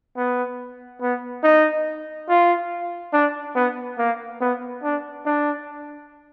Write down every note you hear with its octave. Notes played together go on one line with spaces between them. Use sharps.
B3
B3
D#4
F4
D4
B3
A#3
B3
D4
D4